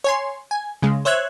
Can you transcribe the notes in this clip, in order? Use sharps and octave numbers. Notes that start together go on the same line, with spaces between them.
C#5 G#5 C6
G#5
C#3 G#3
C5 C#5 E5 F#6 G#6